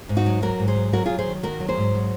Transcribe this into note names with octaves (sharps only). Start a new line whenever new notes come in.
G#2
D#4 F#4
F#3
F#3 F#4 A#4
G#2
G#4 C5
F#3
F#3 F#4 A#4
F#3 F4 G#4
G#4 C5
D#3
D#3 F#4 A#4
F#3
G#4 C5
G#2
F#3